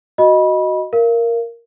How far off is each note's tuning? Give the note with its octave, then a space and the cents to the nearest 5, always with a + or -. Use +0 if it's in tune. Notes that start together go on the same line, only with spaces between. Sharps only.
F#4 +0 D#5 +0 B5 -25
A#4 +0 F5 -35